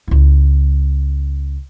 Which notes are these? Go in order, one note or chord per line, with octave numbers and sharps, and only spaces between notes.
C#2 E4